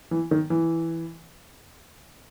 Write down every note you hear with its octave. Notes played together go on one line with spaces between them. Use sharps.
E3
D#3
E3